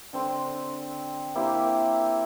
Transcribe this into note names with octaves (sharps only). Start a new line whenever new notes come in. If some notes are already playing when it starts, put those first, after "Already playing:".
D3 C4 C6
A#3 C4 E4 G4